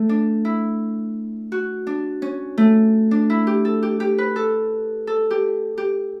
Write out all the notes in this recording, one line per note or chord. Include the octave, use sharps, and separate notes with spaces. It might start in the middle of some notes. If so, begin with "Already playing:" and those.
Already playing: A3
D4
E4
F#4
D4
C#4
A3
D4
E4
G4
A4
G4
G4
B4
A4
A4
G4
G4